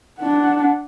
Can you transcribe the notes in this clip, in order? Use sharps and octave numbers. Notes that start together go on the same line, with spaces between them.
D4 F#5